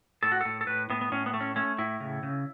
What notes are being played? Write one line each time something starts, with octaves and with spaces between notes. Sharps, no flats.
A2 A4
F#4
A2 A4
A4
A2 B4
A2 B3
B3
A2 C#4
B3
A3
C#4
A3 C#4
A2 E4
C#3
C#3